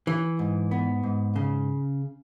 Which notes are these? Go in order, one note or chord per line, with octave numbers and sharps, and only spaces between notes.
E3
G#2
B3
G#2
C#3